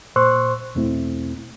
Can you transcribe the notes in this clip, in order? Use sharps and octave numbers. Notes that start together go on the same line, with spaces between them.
A#2 C5 C6 C#6 E6 F#6
E2 B2 A3 C4 E4